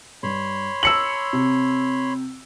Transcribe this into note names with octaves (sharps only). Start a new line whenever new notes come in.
G2 C#5 B5 C6
A5 E6 A#6 C#7 F#7
C3